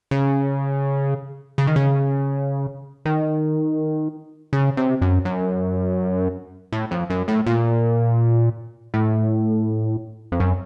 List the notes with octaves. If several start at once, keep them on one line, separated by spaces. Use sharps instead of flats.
C#3
C#3
D#3
C#3
D#3
C#3
C3
F#2
F#2
A2
F2
F#2
A2
A#2
A2
F2
F#2